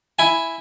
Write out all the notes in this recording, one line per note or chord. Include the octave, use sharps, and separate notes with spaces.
E4 G#5